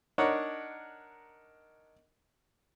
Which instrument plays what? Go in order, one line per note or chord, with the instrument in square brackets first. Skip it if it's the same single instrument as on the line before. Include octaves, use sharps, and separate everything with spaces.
[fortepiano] D4 D#4 A#4 C#5 F#5